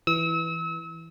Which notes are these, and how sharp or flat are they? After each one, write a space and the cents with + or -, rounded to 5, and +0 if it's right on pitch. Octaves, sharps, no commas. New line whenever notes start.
E3 +0 E6 -35